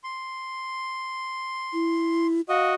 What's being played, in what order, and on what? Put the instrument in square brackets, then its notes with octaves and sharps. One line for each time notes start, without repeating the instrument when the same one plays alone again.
[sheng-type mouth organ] C6
[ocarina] E4
[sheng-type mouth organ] F#4 D#5 [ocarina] F5